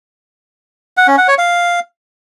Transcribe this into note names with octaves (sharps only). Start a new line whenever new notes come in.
F#5
C#4
F#5
C#5
F5